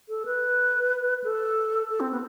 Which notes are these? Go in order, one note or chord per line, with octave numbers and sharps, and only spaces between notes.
A4
B4
A4
A4
C4
B3